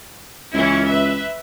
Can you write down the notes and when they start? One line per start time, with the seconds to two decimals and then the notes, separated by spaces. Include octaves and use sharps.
0.54 C#2 E3 C#4 E4
0.88 B4 E5